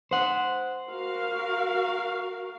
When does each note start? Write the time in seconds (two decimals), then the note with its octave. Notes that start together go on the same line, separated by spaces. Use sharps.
0.11 C5 F#5
0.89 F#4 A#4 F5